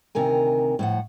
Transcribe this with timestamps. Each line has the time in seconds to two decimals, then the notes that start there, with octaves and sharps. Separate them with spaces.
0.15 D2 C3 D#3 A#4 G#5
0.79 A2 F3 F#5